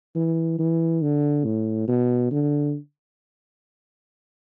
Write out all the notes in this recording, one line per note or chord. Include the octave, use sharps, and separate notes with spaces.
E3
E3
D3
A2
B2
D3